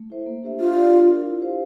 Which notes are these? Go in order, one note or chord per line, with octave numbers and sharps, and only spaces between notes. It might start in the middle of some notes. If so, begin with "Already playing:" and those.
Already playing: A3
E4 A4 C5 E5
A#3
D4 G4 C5 E5
D4 F4
G4 D5 F5
D4
F4 A#4
E4
G4 C5 F5